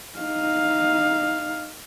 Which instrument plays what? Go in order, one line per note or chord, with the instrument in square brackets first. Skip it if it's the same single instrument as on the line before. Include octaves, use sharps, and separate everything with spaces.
[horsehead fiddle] D#4 F5